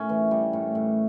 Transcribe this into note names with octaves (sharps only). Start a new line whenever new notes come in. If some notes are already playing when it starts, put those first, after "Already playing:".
Already playing: A2 C#4
E3
G3
A2
A2